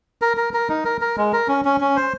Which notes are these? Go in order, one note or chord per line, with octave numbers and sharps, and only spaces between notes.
A#4
A#4
A#4
D#4
A#4
A#4
G#3
A#4
C#4
C#4
C#4
C5